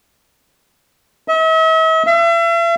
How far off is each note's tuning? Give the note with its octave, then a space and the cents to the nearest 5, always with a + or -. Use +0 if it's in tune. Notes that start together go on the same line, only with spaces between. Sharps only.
E5 -45
E5 +40